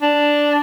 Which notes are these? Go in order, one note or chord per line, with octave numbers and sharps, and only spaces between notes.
D4